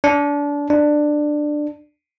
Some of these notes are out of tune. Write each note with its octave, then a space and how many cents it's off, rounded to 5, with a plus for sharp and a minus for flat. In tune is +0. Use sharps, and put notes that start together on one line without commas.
D4 -25
D4 +15